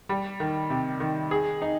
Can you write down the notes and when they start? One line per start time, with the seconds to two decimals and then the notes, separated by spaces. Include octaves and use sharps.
0.09 G3
0.40 D#3
0.70 C3
1.00 D#3
1.31 G#4
1.62 D#4